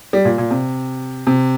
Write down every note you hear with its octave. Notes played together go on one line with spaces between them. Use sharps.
G3
A#2
A#2
C3
C3